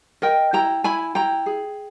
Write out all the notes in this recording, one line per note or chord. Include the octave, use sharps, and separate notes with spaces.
A#4 D#5 G5
E4 G5 A#5
E4 G#5 B5
E4 G5 A#5
G#4